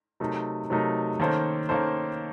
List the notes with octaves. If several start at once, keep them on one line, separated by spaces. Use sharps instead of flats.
C3 F#3 A3 D#4 A#4
C3 F#3 A3 D#4 A#4
D#3 A#3 C#4 A4 C5
D#3 A#3 C#4 A4 C5